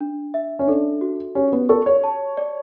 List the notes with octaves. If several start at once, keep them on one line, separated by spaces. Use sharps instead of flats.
D4
E5
C#4
D4 A4
F#4
C#4 G4
B3
A4 C#6
C#5
A5
D5